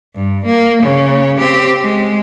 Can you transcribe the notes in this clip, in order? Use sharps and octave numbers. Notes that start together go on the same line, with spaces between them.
G2
A#3
C#3 C#5
C4 G4
G#3